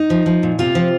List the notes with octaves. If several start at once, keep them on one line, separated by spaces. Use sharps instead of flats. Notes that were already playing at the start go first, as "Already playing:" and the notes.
Already playing: D#4
F3
F3
A#2
C3 F4
F3